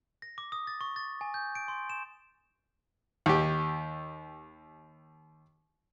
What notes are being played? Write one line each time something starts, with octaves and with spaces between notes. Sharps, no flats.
A#6
D6
D#6
A6
C#6
A6
G#5
G6
D7
C6
E7
D#2 G4